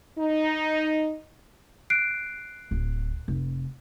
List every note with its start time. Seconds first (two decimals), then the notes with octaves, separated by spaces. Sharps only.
0.17 D#4
1.90 F#6 C7 D7
2.71 D1
3.28 F1